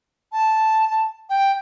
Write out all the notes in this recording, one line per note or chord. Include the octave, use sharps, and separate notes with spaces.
A5
G5